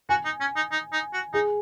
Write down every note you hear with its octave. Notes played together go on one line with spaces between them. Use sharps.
F#4 G#5
D#4
C#4
D#4
D#4
D#4
F#4
D#4 G#4